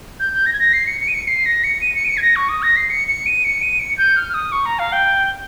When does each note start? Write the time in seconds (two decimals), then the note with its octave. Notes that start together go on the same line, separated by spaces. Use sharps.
0.20 G6
0.33 G6
0.46 A#6
0.53 G#6
0.60 A#6
0.73 C7
0.87 C#7
1.01 C#7
1.08 D#7
1.14 C#7
1.28 C7
1.46 A#6
1.64 C#7
1.81 D#7
1.95 C#7
2.05 D#7
2.09 C#7
2.17 G#6
2.22 A#6
2.36 C#6
2.49 D#6
2.63 A#6
2.76 C7
2.90 C#7
3.08 C#7
3.26 D#7
3.44 C#7
3.62 D#7
3.80 C#7
3.98 G6
4.17 F6
4.29 F6
4.34 D#6
4.52 C#6
4.66 A#5
4.79 F5
4.93 G5